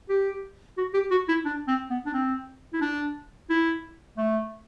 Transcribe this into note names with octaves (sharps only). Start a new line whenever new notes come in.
G4
F#4
G4
F#4
E4
D4
C4
B3
D4
C4
E4
D4
E4
A3